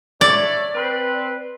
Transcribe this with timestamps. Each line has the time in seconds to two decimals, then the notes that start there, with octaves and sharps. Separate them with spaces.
0.21 D4 E4 C#5 D5
0.74 C4 B4